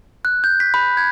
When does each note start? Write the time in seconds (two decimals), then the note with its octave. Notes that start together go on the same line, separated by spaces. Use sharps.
0.25 F#6
0.44 G6
0.60 B6
0.74 B5
0.97 G#6